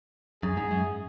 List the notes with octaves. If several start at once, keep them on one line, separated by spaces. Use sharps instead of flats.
F#2 G#4
G#2
F#2